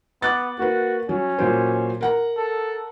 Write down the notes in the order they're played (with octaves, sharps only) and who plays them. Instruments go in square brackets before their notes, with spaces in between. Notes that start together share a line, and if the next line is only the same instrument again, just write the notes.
[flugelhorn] B3 [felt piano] D6 F#6 A6
[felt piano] A#3 B4 [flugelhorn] F#4
[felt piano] F#3 [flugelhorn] C#4
[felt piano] A#2 F#3 C5
A#4 F#5 A#5
[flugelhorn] A4